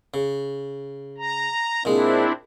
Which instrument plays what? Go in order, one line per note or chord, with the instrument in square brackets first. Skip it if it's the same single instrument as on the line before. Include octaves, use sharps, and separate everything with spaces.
[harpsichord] C#3
[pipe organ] A#5
[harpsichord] A#2 G#3 [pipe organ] C4 D4 E4